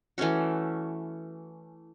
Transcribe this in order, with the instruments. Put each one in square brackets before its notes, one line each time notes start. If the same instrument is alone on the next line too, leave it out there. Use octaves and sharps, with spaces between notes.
[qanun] E3 A3 C#4 F#4